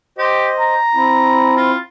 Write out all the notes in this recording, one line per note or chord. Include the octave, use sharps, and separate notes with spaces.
G4 C5 D#5
A#5
C4 E4
F4